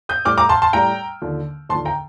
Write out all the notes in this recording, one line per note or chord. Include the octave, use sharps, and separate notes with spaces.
D#6 G6
A2 G3 D6 F6
A#5 D6
A5 C6
A5 C6
A2 G3 G5 A#5
D#2 D3 F3
D#2 D3 F3 A5 C6
G5 A#5